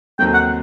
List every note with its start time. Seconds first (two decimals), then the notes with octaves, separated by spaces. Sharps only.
0.19 D#2 D#3 F#3 A3 C4 G5
0.34 F#5